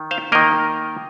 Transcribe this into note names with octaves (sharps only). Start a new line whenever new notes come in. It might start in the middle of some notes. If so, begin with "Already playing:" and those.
Already playing: D#3
C5 F5
D#3 A#3 A#4 D#5